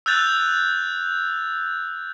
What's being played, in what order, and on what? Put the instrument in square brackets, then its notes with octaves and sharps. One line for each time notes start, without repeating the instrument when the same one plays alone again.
[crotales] E6 F#6 G6 A6 F7